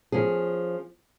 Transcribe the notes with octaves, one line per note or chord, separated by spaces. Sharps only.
F3 C#4 G#4